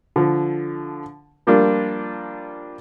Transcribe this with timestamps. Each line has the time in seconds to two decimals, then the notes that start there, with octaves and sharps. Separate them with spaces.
0.16 D3 F3
1.47 F3 G3 A#3 D4 F4